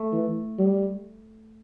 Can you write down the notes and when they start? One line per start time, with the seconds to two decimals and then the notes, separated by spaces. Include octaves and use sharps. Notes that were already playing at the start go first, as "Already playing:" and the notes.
Already playing: A3
0.13 E3
0.58 G3